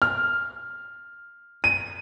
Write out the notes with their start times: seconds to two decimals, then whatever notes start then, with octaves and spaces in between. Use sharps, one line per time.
0.02 F6
1.64 D#7